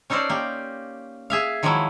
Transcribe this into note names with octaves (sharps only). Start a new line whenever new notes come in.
C#4 D#4 A4 A#4 C5 D5
A#3 G4
G#4 E5 F5
D#3 F3 F#3 G#3 A#3 E4